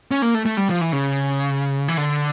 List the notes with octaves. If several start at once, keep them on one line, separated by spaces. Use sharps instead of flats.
C#4
A#3
A3
A3
G3
F3
E3
C#3
E3
D3